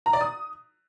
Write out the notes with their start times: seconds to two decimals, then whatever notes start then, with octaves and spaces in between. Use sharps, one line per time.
0.06 A#5
0.13 D5
0.21 D#6